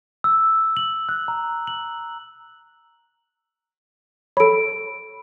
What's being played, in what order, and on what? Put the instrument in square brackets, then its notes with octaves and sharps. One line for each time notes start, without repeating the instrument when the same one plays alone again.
[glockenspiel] E6
F#7
F#6
A#5
F#7
[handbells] A4 C#5 [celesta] B5 D7